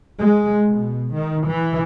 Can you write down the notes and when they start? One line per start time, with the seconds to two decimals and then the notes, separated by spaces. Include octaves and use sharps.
0.20 G#3
0.68 B2
1.13 D#3
1.47 E3